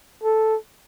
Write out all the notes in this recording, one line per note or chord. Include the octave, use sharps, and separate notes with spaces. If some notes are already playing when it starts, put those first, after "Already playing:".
A4